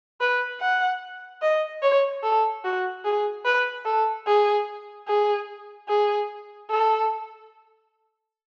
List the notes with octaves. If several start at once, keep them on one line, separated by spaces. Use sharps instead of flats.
B4
F#5
D#5
C#5
A4
F#4
G#4
B4
A4
G#4
G#4
G#4
A4